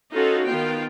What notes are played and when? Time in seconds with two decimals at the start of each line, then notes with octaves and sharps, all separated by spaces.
0.14 C#4 D#4 F4 F#4 A4
0.46 D#3 B3 F4 G5